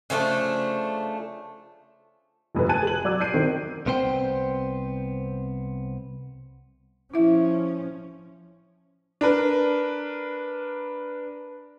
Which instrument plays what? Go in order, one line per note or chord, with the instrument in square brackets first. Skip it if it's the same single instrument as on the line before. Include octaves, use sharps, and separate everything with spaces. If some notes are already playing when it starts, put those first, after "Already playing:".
[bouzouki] C#3 F3 A3 D4
[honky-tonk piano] F1 F2 D3 B4
G#5 A5 F#6 G#6 D#7
G#4 F#7
F#3 D5 D6 E6 G#6
G6 G#6 C7 D7 D#7
D#3 C4
[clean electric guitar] C2 B3 C4 C5 G5
[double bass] F3 C#4 [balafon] E4 E5
[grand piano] D4 A#4 B4